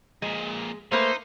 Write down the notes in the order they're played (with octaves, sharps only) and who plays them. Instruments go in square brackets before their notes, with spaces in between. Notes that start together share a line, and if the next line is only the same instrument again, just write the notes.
[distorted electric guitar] F2 A#2 [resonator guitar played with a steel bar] G#3
[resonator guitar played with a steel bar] A3 A#3 B4 [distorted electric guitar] D#4 [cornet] C5